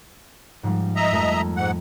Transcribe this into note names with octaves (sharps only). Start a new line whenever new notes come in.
G#2 F3 G3
D#5 E5 A#5
F2 A3 A#4
G#2 F#5